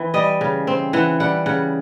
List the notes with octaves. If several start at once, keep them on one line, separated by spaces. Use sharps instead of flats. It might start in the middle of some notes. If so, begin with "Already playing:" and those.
Already playing: E3 C4
G3 D#5
C#3
C4
E3 F#5
G3 F#5
C#3 F#5